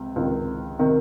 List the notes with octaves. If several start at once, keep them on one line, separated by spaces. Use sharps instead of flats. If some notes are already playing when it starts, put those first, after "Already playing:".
Already playing: C#2 C3
C#2 C3 D#3
C3 D#3